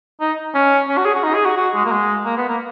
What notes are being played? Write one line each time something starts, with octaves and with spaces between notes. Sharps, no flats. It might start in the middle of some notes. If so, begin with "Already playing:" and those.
D#4
C#4
C#4
F#4
G#4
F#4
D#4
G#4
F#4
F#4
G#3
A#3
G#3
A#3
B3
A#3